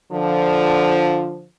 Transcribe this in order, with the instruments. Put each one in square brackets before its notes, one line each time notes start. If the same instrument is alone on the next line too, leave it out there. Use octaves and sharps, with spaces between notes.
[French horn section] D3 F3